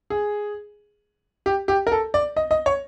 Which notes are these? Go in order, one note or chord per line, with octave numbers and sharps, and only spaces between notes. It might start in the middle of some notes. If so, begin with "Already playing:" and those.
G#4
G4
G4
A#4
A4
D5
D#5
D#5
C#5